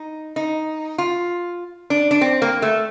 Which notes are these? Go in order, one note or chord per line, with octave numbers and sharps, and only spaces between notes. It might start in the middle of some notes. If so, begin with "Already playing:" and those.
Already playing: D#4
D#4
F4
D4
D4
C4
A#3
A3